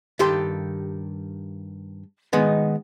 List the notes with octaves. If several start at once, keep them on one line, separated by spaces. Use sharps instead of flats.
G2 D#3 G4 A4 C6
D#3 G#3 B3 D#4